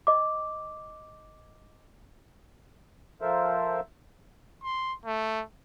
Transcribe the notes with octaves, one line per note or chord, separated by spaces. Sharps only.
D#5 D6
F3 A4 A#4 C5 E5
C6
A3